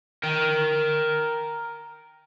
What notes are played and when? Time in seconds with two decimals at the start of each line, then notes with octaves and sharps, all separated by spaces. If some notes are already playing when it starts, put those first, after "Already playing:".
0.23 A#4 G5